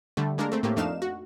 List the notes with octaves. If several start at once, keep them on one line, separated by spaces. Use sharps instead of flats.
D3 G3 A3
G#3 A#3 D4 A4 A#4
A3 C4
A2 A3 A#3 G4
F2 A3 D4 D#4 F5 E7
F#4